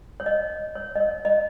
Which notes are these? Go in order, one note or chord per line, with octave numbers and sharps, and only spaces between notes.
C#5
D#5
C#5
D#5
C#5
D#5